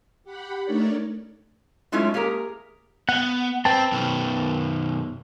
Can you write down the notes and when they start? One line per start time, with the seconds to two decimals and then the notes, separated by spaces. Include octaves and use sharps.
0.24 G4 F#5 B5
0.65 A3 D4 D#4 A#4 C#5 D5
1.92 F#3 G#3 A3 C#4 E4 F4
2.14 A#3 G4 G#4 A#4 A#5
3.09 B3 F#5
3.65 C4 B4 G5 A5
3.92 F#2 B2 D#3